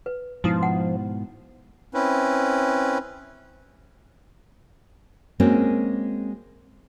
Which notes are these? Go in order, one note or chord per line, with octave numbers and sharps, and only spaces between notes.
B4
G#2 B2 F3 D#4 E4 D#6
F#5
C4 C#4 E4 B4
G#3 A#3 C4 C#4 F#4